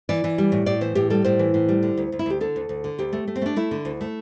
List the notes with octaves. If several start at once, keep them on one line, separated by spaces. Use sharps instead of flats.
E3 D5
E3
G3
A2
A2 D5
E3 C5
A2 G4
G3 A4
A2 C5
E3
A2
G3
D3
D2
D2
E4
D2 G4
D3 A4
D2
D2
D3
D2 G4
A3
A3
C4
A3 D4
A3 E4
D3
D2
A3